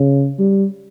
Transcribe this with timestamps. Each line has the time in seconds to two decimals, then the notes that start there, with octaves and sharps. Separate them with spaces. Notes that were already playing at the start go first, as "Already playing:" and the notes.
Already playing: C#3
0.39 G3